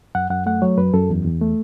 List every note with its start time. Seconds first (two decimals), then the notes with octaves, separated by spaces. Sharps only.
0.15 F#2 F#5
0.30 F#2 F#5
0.46 A3 F#5
0.62 F#3 C#5
0.78 F#2 B4
0.94 F#2 A4
1.10 E2
1.25 E2
1.41 A3